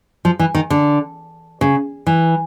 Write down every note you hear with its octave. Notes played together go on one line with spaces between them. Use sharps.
F3
E3
D#3
D3
C#3
E3